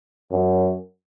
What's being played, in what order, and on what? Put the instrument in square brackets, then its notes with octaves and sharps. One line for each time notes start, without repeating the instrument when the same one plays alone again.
[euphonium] F#2